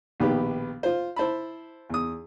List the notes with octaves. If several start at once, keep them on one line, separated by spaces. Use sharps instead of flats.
A#1 B2 D#3 B3 G4 B4
F4 C5
E4 C5 A5 B5
E2 D#6